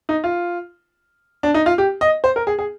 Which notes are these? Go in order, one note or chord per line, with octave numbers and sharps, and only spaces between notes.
D#4
F4
D4
D#4
F4
G4
D#5
C5
A#4
G#4
G#4